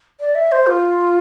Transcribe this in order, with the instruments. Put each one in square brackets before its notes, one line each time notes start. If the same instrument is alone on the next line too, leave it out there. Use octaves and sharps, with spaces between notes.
[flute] D5
E5
C5
F4